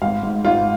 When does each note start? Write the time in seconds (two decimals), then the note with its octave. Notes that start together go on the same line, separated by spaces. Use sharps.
0.02 G#1 F5
0.23 G#2
0.44 G#1 F4